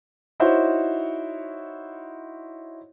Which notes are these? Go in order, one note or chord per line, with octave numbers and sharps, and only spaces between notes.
D#4 E4 F#4 C5 C#5